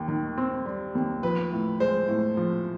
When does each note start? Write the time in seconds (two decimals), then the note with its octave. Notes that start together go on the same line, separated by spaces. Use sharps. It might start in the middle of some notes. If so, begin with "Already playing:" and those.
Already playing: D#2
0.08 D#3
0.38 C4
0.66 G3
0.95 D#2
1.23 F3 B4
1.52 A2
1.80 G#3 C5
2.09 A2
2.37 F3